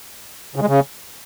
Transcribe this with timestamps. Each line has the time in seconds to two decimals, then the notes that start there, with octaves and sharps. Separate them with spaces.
0.56 C#3
0.61 G#3
0.67 C#3